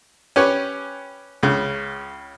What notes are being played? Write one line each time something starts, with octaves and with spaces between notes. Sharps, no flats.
C#4 G4 B4 C#5
C#2 C#3